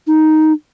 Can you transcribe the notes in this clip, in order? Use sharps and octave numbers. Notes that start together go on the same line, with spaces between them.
D#4